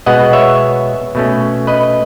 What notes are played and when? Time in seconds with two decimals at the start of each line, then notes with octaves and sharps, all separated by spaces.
0.06 B2 G#3 B3 D#5 F#5
0.33 C#5 E5
1.15 B2 A3 C#4
1.67 B4 D#5